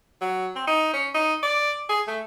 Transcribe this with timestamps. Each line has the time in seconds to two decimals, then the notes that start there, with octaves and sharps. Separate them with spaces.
0.21 F#3
0.56 C4
0.67 D#4
0.93 C#4
1.15 D#4
1.43 D5
1.89 G#4
2.08 A3